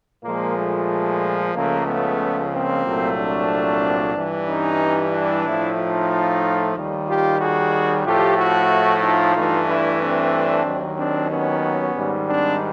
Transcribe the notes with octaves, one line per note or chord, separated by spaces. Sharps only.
A#2 F3 G#3 A#3
A3
C#2 C#3 F3 A3 A#3
A3 B3
A#3 C4
C2 A#2 F#3 A3
C4 D4
G2 E3 G3
C#4 D#4
D4 E4
A2 F3 A3
D#4 F4
D#2 D#3 G3
F4 G4
F#4 G#4
A2 F3 A3 F4 G4
E4 F#4
D#4 F4
G2 E3 A3
D4 E4
C4 D4
D#2 D#3 F#3
C4 D4
B3 C#4
G#2 D#3 G3
C4 D4